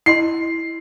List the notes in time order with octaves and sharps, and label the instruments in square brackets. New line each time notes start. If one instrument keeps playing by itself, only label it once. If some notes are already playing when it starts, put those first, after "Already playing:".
[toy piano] E4 D#5 C6 [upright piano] C7